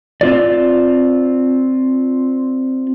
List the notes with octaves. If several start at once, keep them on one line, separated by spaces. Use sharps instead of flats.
C4 F4 D5